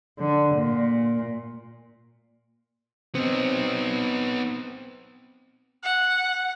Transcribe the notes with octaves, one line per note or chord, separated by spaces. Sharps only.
D3
A#2
B3 C4 D#4
F#5